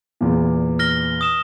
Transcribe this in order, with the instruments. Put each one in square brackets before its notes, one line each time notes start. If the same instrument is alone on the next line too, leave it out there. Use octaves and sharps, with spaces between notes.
[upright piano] E2 A#2
[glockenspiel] F6 A#6 G7
D#6 E7